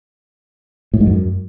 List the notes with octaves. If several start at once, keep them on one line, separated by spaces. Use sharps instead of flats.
A2
G#2
F#2